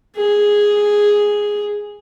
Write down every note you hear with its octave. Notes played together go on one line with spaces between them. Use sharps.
G#4